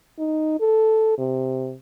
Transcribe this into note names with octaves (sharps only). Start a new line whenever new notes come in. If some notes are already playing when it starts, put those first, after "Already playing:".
D#4
A4
C3